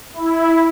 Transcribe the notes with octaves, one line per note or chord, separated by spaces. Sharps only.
E4